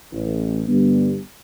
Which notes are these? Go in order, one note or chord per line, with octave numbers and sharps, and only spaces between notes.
A1
G2 D3 G3 B3